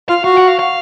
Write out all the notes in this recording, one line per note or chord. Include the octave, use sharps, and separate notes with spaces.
F4 F5
F#4 F5
F#5
F5
F5